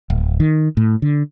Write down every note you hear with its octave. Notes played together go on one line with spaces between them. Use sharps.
D1
D#3
A2
D3